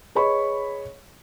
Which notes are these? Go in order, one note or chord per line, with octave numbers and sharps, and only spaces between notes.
G#4 B4 C#5 D#5 B5 C#6